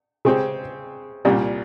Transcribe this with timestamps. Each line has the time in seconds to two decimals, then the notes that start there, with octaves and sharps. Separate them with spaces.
0.25 C#3 G#3 C4 G4
1.25 C2 A#2 G3